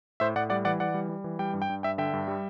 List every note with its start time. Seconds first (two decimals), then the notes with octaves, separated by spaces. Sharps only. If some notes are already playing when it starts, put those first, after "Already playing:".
0.20 A2 C5 E5
0.35 A2 D5 F#5
0.50 G3 D5 F#5
0.65 E3 D5 F#5
0.80 E3 D5 F#5
0.94 G3
1.09 G3
1.24 E3
1.39 G3 G5
1.54 G2
1.62 G5
1.70 G2
1.83 G2 E5 G5
1.98 D3 E5 G5
2.13 G2
2.28 G3